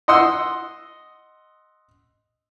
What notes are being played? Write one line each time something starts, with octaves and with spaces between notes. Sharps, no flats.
D#5 F#5 C6 D#6 E6